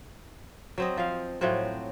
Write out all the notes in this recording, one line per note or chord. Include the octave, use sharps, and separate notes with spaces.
F#3 C4 D#5
F3 F5
A2 F3 F#3 C4